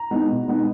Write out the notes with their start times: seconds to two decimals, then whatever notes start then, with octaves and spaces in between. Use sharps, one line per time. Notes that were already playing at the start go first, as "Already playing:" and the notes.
Already playing: A#5
0.11 G#3 B3 D#4
0.30 B2
0.48 G#3 B3 D#4